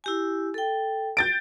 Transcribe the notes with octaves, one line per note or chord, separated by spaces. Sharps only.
E4 G4 G#5
A4 G5
G6 A6 D7